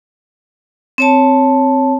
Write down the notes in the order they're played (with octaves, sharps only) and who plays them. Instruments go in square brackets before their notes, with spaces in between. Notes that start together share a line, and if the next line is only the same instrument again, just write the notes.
[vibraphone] C4 C#5 A5